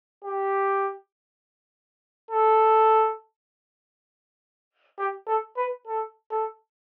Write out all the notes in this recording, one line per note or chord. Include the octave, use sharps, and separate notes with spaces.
G4
A4
G4
A4
B4
A4
A4